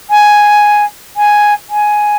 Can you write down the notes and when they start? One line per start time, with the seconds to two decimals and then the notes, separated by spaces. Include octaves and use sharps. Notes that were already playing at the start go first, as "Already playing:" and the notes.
0.10 G#5
1.16 G#5
1.69 G#5